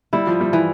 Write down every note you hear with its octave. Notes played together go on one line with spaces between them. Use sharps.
G3 E4
F3
G3
E3